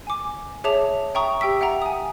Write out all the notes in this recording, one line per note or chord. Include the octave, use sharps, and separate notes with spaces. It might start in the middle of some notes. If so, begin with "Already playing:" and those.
G#5 D6
G#4 C#5 E5 A5 D6 F7
E5 G5 A#5 C#6 D#6
G4 G5 E6 B6
E5 F#5 G5 A#5
G#5 D#6